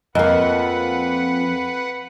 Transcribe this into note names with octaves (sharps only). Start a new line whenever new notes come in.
F2 A#3 B4 D#5 F#5